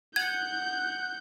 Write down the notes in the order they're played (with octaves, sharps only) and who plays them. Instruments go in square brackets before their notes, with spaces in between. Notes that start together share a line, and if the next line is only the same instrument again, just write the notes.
[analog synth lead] F#5 [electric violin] G6 [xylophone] G#6